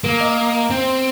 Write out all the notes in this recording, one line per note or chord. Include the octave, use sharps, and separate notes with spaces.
A#3 A#4
D#5
C4